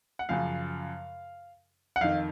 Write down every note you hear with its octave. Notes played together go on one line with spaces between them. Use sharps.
F#5
F#2 C#3 F3 F5
F#5
F2 D#3 F5